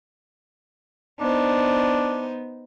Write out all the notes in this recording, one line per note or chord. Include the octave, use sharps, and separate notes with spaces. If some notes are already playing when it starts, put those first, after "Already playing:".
B3 D4 D#4 C5